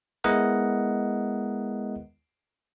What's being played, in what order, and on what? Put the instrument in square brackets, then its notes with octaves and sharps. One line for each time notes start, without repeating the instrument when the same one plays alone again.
[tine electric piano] G#3 B3 E4 A#4 D#5 F#5